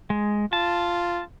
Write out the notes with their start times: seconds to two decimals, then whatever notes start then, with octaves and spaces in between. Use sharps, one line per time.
0.10 G#3
0.53 F4 A5